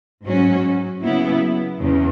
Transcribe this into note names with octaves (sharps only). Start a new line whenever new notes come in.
G#2 F#3 C#4 F#4
C#3 F#3 B3 E4
E2 C#3